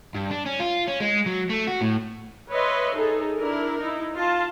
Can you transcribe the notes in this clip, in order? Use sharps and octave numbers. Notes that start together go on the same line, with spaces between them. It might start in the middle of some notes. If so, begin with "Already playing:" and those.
G2
D4
C#4
F4
C#4
G#3
F#3
A3
F#4
A2
B4 C#5 D#5 E5 C6
D#4 G#4 A4
D4 E4 A#4
D#4 E4
F4 A5